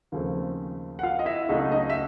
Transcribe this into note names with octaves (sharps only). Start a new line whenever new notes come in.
D#2 C#3 F3 A3 C4
F#5
F4 F5
D#5
E4 E5
C#2 C#3 F#3 A3 D#4 D#5
D#4 D#5
E5